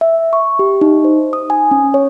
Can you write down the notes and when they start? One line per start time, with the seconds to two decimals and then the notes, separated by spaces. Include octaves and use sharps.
0.01 E5
0.33 C#6
0.59 G4
0.81 D#4
1.04 C5
1.33 D#6
1.50 G#5
1.71 C#4
1.94 C#5